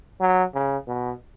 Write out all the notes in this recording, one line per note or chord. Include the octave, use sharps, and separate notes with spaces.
F#3
C#3
B2